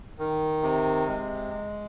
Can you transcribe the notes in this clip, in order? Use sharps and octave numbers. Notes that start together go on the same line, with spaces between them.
D#3
C3
G#3